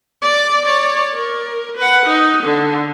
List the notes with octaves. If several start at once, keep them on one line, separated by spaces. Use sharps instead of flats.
D5
C#5 D5
A#4
B4 F#5
D#4
D3